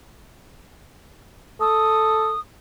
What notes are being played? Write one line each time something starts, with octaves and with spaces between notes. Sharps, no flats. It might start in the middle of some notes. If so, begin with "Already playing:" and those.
A4 D#6